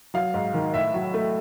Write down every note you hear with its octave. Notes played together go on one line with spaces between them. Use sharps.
F#3 F5
G#2
D#3
A2 E5
F#3
A3